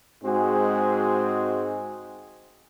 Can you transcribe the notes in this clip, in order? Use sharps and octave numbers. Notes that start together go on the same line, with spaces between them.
G#2 G#3 C4 F#4 G#4